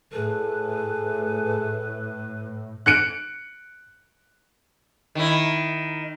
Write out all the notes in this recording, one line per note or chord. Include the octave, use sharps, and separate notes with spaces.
A2 G#4 A4 B4
F#6 C#7 D7
D#3 E4